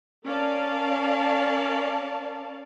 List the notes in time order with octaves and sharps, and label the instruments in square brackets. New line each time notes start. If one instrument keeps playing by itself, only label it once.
[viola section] C#4 A#4 D5 F5 A5